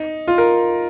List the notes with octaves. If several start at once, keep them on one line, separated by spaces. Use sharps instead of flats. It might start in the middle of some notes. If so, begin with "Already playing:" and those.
Already playing: D#4
F4
A#4